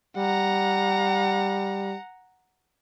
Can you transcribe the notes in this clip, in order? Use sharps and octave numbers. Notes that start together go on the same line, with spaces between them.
G3 F#5 A#5